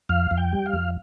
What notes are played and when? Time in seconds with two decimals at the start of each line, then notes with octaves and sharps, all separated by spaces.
0.09 F2 F5
0.31 F2
0.37 G5
0.52 G3
0.66 F5
0.73 F2